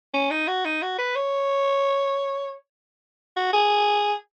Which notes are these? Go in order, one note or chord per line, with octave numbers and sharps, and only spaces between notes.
C#4
D#4
F#4
D#4
F#4
B4
C#5
F#4
G#4